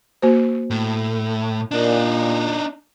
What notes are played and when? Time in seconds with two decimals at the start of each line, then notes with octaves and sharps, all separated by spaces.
0.22 A#3 F#4 C5
0.70 A2
1.71 A#2 D4 D#4